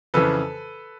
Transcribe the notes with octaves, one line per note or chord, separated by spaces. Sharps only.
F2 C#3 E3 A4 B4